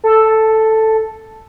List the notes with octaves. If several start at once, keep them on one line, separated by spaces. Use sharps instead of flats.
A4